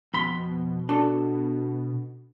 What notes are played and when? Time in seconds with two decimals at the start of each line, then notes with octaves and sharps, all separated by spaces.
0.14 F2 B2 B5 C6
0.89 D4 F#4 A4